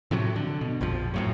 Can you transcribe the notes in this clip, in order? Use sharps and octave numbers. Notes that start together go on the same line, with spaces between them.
A2 C3 F3 F#3
D3
B2
A#1 F2 F3
F#2 A2 F#3